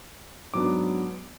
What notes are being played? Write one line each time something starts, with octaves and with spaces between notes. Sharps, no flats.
G#2 F#3 B3 D4 D6